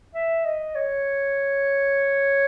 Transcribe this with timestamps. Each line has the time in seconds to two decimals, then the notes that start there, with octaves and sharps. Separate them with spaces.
0.14 E5
0.45 D#5
0.75 C#5